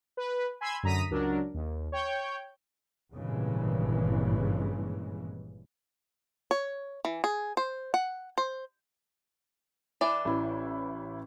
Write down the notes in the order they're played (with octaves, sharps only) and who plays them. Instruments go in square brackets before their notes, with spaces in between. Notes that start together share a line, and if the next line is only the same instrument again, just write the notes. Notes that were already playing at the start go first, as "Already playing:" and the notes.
[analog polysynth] B4
G#5 B5 C6 E6 G#6
F#2 D3 A#5 D#6 B6 D#7
C#2 F#3 D4 A#4
D#2
C#5 G5 G6
[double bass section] G#1 G2 A#2 C#3 E3 G#3
[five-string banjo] C#5
E3
G#4
C5
F#5
C5
E3 D4 D5
[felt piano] A1 E4